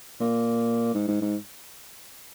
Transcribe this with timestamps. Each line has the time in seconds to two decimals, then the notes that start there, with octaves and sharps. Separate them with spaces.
0.20 A#2
0.94 G#2
1.08 G#2
1.22 G#2